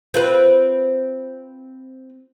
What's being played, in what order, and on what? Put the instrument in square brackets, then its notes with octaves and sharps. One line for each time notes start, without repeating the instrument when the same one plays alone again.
[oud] C4 F4 B4